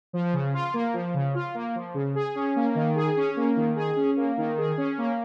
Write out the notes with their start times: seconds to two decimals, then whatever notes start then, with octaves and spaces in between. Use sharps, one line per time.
0.13 F3
0.33 C#3
0.54 F4
0.74 A#3
0.94 F3
1.14 C#3
1.35 F4
1.55 A#3
1.75 F3
1.94 C#3
2.15 G#4
2.35 C#4
2.56 A#3
2.75 D#3
2.95 G#4
3.17 C#4
3.36 A#3
3.56 D#3
3.76 G#4
3.96 C#4
4.17 A#3
4.37 D#3
4.58 G#4
4.77 C#4
4.98 A#3